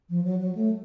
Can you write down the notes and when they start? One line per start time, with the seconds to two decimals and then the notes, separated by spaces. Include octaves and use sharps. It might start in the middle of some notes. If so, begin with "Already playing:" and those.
0.09 F3
0.24 F#3
0.40 F#3
0.55 A3